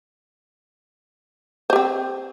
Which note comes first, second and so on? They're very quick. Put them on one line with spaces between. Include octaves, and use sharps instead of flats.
C5 G4 C4